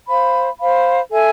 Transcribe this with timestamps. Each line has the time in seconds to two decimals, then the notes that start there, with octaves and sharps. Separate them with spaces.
0.08 C5 F5 B5
0.60 C5 F5 B5
1.11 A4 E5 G#5